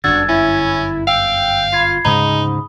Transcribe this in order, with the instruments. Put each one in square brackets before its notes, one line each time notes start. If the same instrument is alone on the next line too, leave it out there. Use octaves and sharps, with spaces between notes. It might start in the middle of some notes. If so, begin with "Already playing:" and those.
[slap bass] G1 F#2 D3 [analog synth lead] D4 [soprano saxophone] F#4 [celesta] E6 G#6 A6
[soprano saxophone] C#4 [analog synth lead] E4
[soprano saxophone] F5 [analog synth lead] G5 [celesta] E6
[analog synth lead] F4 [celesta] B5 G#6 C7
[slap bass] D2 C#3 G#3 [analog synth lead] G#2 [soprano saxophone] D#4 [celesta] B5 D#6